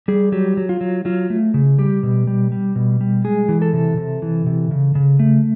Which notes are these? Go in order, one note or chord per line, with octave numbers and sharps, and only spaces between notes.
G3 G#4
F#3 G4
F#3
F4
F#3
F#3 F4
A3
C#3
G3 G4
B2
G3
G3
B2
G3
G#3 G#4
E3
A4
C3
C3
E3
C3
C#3
C#3
A3